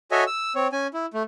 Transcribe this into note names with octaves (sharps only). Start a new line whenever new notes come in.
F#4 A4 C#5 D#5 E5 G#5
E6
C4 C#5
C#4 G#5
E4
A3